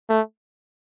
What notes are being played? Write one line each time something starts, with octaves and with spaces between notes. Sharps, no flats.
A3